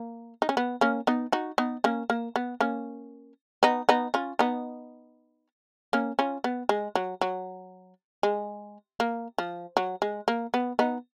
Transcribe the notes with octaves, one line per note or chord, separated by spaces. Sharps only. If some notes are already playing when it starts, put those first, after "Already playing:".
Already playing: A#3
D#4
C#4
B3
A#3 C#4
B3 D#4
D#4 F#4
B3 D#4
A#3 C#4
A#3
B3
A#3 C#4
B3 D#4
B3 D#4
C#4 F4
B3 D#4
A#3 C#4
C#4 F4
B3
G#3
F#3
F#3
G#3
A#3
F3
F#3
G#3
A#3
B3
B3 D#4